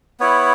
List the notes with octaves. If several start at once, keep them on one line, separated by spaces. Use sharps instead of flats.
B3 E4 C#5